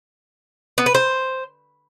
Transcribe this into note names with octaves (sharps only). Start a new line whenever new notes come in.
B3
B4
C5